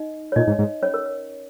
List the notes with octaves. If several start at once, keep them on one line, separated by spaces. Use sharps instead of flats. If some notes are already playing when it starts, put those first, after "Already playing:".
Already playing: D#4 D#5
C#5
A#2 D#4 D#5
G#2
G#2
C#4 C#5
A#4
A#4